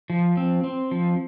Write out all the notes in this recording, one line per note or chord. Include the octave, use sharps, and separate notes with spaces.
F3
C4
C4
F3